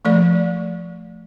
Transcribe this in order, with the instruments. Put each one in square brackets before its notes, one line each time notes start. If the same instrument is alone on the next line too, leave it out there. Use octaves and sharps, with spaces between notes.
[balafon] F3 A3 D5